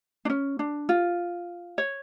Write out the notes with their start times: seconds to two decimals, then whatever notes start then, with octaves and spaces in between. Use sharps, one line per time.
0.25 D4
0.30 C#4
0.59 D4
0.89 F4
1.78 C#5